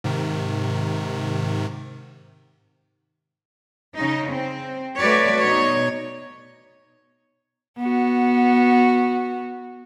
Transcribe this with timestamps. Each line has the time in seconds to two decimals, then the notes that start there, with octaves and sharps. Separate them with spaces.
0.04 G#2 C3 D#3
3.97 C#3 D#4
4.31 C4
4.99 A3 F#4 B4 C#5 D5
5.42 B2 D#4 C#5
7.78 B3 F#4